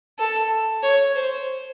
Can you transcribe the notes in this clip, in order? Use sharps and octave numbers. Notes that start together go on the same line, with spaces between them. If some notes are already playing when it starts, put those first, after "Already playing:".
A4
C#5
C5